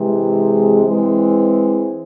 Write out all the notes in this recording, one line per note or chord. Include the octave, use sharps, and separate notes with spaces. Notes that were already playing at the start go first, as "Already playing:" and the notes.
Already playing: C3 E3 G#3 C4
E3 G#3 C4